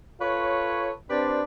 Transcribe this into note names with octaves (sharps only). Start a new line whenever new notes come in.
F4 A4 B4 C#5
C4 D4 G4 B4 C5 D5